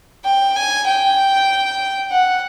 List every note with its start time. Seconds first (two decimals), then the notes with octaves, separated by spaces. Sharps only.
0.25 G5
0.56 G#5
0.87 G5
2.11 F#5